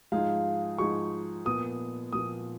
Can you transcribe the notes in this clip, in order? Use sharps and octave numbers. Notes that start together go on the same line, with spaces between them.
G#2 F3 G#3 D#4 G#4 F5
G#2 F3 G#3 D#4 G#4 C#6
A#2 F3 B3 D#6
A#2 F3 B3 D#6